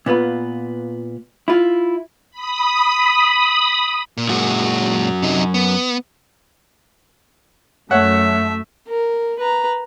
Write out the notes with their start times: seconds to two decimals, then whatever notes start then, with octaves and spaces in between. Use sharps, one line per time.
0.06 A#2 B3 F4 B4
1.48 E4 F4
2.31 B5 D#6
4.17 A#2
4.29 F#2 A#2 G#3 F#4
5.23 C3 D#4
5.54 B3
7.91 F#2 A3 C#5 E5 F#5
8.88 A#4
9.39 B4 A#5